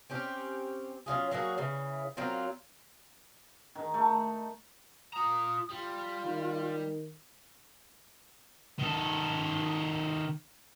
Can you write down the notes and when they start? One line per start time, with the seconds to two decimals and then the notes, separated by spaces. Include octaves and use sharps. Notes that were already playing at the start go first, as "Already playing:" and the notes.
0.10 C4 C#4 G4
1.06 F#3 C#4 F4 G#4
1.31 F#3 A#3 F#4 G#4
1.58 C#3 E3
2.17 F#3 A#3 C4 F4
3.76 D#3
3.94 A3
5.14 F4 A#5 D#6
5.70 G3 F4
6.24 D#3
8.79 D#3 A4